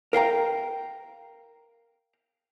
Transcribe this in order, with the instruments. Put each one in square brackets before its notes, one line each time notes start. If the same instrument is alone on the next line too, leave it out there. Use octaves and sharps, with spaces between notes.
[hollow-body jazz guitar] A#4 F5 G5 A#5